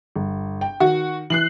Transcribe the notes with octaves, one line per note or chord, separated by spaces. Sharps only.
G1
G5
D#3 F#4
E3 F#6 C7 F#7